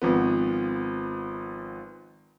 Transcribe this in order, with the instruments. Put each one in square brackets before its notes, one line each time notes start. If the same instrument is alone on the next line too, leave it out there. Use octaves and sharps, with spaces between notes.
[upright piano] G#1 F3 B3